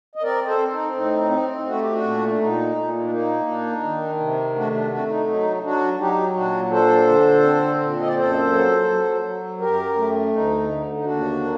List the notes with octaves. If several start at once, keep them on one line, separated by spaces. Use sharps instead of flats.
D#5
C4 A#4 D5
A4 C5
C4
D#4
A2 D#4
C4
A3 F#4
G4
D4 F#4
A#2
D4
A#2 D#4
A#2
D4
A#3 D#4
D4
D#3
C3
A3 D4 F#4
D4
A3 D4 F#4
D#4
F#3 D#4
F#3 D4 F#4
F#3 D#4 G4
A#2 D4 F#4
D4 A4 C5
D3
C4
A#2
D#5
D5
F#2 A4 C5
F#3
F#3
F#3
F#2 G4 A#4
A3
D2 D#4
D3
D#4
D#2 D4 F#4
A#3